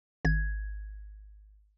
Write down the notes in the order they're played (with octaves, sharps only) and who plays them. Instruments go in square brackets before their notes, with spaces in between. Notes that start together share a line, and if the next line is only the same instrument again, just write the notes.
[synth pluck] G#1 G#6